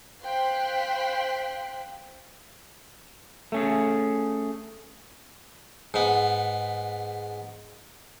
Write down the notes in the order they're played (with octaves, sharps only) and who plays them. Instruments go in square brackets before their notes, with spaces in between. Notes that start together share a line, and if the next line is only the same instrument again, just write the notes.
[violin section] C5 F5 G5 C6 F#6 B6
[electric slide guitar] A3 C#4 G#4
[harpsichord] G#2 B3